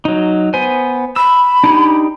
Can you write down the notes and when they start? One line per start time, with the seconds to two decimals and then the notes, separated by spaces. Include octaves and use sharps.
0.05 F#3 D#4
0.54 B3 C5 G#5
1.16 B5 E6
1.64 D4 D#4 G4